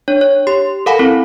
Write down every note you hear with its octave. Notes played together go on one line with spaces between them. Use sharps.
D4 C#5
C#5
G4 C6
A4 A#4 F5 F#5 G#5 B5
C4 E4 A4